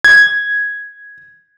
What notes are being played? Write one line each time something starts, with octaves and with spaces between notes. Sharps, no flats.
G#6